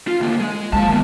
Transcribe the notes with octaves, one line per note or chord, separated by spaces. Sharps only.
F4
D2 A#3
G#3
F3 G#3 A#3 A5
D#3 B3